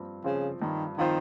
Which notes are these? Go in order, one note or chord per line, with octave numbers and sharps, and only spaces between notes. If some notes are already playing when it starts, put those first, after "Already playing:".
Already playing: G2 F3 C4
C#3 F3 C4 F4 C5
G2 D#3
D#3 F3 C4 F4 C5